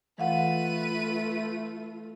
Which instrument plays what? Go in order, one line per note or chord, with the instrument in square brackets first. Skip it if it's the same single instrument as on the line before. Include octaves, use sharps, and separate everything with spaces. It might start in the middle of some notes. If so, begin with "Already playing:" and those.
[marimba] E3 F5 F#5 [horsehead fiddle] A3 F4 [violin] B4 D#7